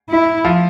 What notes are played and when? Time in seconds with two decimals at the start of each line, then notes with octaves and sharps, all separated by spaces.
0.09 E4
0.45 F3